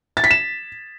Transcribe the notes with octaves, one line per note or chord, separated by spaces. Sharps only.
A6
B6
E7